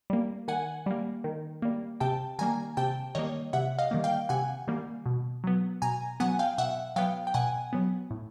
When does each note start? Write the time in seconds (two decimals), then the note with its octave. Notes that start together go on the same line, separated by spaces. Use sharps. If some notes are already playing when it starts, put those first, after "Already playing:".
0.10 G3 A#3
0.48 D#3 F#5 G#5
0.86 G3 A#3
1.24 D#3
1.62 G3 A#3
2.00 C3 G5 A5
2.39 D#3 G3 A#3 G#5 A#5
2.77 C3 G5 A5
3.15 D#3 G3 A#3 C#5 D#5
3.53 C3 E5 F#5
3.79 D#5 F5
3.91 D#3 G3 A#3
4.04 F5 G5
4.29 C3 F#5 G#5
4.68 D#3 G3 A#3
5.06 B2
5.44 F#3 B3
5.82 B2 G#5 A#5
6.20 F#3 B3 F#5 G#5
6.39 F5 G5
6.58 B2 E5 F#5
6.96 F#3 B3 F5 G5
7.27 G5
7.34 B2 F#5 G#5
7.73 F#3 B3
8.11 A2